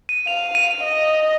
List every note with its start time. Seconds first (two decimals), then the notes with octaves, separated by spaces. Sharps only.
0.09 D#7
0.27 F5 F7
0.55 D#7
0.83 D#5